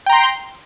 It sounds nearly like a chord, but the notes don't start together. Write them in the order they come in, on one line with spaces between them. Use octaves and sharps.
G5 A#5 C6